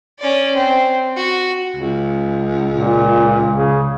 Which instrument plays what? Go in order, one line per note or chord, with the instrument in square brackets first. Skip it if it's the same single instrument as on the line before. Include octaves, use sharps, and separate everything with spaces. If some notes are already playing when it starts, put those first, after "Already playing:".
[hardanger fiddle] C#4 D5
C4
F#4
[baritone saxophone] C#2
[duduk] A#2
C#3